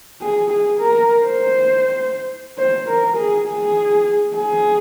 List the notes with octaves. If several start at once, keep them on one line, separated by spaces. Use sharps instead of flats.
G#4
G#4
A#4
C5
C5
A#4
G#4
G#4
G#4